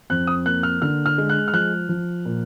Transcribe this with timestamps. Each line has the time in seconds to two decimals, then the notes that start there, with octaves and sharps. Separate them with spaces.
0.10 F2 F#6
0.27 D#6
0.46 A#3 F#6
0.63 F6
0.82 D3 F6
1.06 F6
1.18 G#3
1.29 F#6
1.48 F6
1.53 F3 F#6
1.89 F3
2.25 A#2